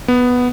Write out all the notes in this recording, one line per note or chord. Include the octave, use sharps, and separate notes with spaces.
B3